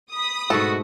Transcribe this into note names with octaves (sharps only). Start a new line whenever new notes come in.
B5 D#6
G#2 B2 A3 F#4 A4